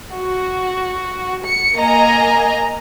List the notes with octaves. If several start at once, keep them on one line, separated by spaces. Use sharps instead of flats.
F#4
C#7
A#3 D#5 G#5 A#5